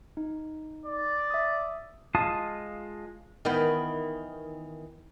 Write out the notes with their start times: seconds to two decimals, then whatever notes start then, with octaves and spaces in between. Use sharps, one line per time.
0.17 D#4
0.86 D5
1.30 E5 D#6
2.15 G#3 F4 F5 A5 D#6
3.45 D#3 E3 B3